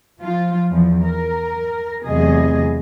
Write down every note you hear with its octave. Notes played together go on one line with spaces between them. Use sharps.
F3 F4
E2 F3
A#4
E2 C3 F#3 A3 G#4 D#5